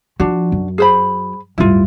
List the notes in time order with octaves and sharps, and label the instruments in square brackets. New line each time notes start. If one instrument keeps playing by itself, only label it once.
[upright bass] F3 [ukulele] D4 F#4
[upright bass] F#2
[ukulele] G#4 C5 B5
[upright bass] D1 G2 [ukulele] E4 F4